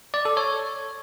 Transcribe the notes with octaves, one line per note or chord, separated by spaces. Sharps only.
D5
A4
C#5